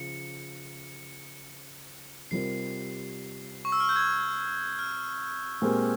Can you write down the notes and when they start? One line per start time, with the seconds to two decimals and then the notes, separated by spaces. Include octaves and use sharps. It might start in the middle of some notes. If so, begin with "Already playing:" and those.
Already playing: C#3 F3 C#7
2.31 C3 G3 C4 F4 A#4 C7
3.65 C#6
3.72 E6
3.80 F6
3.89 G6
3.96 G#6
4.79 F6
5.62 A#2 G#3 C4 G4 A#4